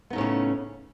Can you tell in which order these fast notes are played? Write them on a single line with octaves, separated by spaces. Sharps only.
B3 D#4 A2 C#4 C#3